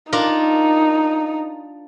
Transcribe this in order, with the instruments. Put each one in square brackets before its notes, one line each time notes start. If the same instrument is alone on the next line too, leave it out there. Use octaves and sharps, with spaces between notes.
[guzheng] D4 F4 A#4 [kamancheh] D#4